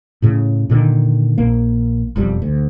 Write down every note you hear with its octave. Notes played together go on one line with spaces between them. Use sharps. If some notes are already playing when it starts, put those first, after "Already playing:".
A2 C#3
A#2 D3 D#3
A#1 A#3
E1 F2 G3
D2